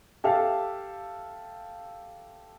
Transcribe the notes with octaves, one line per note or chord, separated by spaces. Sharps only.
G4 A4 E5 F5